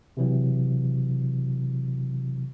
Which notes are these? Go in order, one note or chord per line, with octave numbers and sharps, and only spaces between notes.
C3 E3 F#3